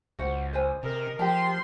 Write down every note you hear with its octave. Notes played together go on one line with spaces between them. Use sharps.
C#2 F#4 C5 F#5
B4 C5 G#5
C3 A#4 D#5
F3 G4 A5 C6